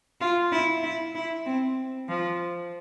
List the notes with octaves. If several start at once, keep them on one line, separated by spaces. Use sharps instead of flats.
F4
E4
E4
E4
C4
F3